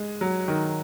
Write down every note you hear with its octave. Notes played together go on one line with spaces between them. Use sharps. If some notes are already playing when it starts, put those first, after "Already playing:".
Already playing: G#3
F#3
D#3